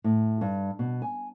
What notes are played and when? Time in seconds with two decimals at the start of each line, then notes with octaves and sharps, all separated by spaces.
0.04 A2
0.41 G2
0.79 B2
1.02 G#5